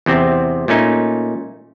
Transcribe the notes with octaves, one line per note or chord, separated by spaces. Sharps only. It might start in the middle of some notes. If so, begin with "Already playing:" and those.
E2 C3 C4
A#2 A3 C#4 D#4